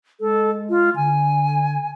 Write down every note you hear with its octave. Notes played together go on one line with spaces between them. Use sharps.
G#3 A4
F4
D3 G#5